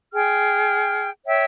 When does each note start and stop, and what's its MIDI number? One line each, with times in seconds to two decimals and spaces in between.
0.13 1.09 68
0.13 1.09 79
0.13 1.09 89
1.25 1.45 73
1.25 1.45 76
1.25 1.45 79